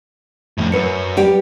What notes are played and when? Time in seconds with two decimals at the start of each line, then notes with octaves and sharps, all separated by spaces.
0.58 F2 A2
0.72 F#2 A#4 B4 C#7
1.17 G3 G4